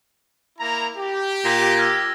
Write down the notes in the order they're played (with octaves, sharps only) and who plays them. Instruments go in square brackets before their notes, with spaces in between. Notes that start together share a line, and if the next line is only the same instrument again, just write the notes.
[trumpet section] A#3 E4 A#5
G4
[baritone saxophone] A#2 [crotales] A#6
[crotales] E6 F6 G#6